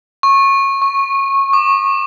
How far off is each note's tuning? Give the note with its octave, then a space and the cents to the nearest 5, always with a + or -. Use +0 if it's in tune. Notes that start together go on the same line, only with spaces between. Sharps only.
C#6 -20
C#6 -10
D6 +30